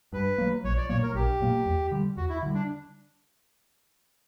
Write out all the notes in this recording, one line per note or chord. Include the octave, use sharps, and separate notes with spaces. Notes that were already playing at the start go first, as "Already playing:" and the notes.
G2 B4
F#3 A#3
A#1 C#5
D5
A#2 F#3 A#3 C#5
A#4
A#1 G4
A#2 F#3 A#3
E2
D3 G3
E2 F#4
E4
D3 G3
D4